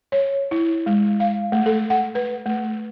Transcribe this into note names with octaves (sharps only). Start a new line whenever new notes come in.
C#5
E4
G#3
F5
A3
A4
F#5
B4
A3